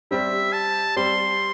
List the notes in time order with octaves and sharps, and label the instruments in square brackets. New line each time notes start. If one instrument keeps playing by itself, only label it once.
[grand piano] G3 C4 G4 D5 [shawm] E5
[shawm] A5
[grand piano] G3 C4 G4 D5 [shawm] C6